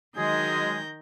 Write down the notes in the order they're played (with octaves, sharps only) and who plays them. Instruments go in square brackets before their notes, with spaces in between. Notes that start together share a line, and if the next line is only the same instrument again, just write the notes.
[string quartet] D#3 G6 A#6 [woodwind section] F#3 G#3 G#4